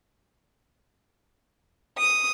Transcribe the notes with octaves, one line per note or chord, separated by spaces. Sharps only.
D#6